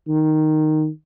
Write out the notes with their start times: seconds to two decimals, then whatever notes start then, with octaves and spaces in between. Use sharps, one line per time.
0.08 D#3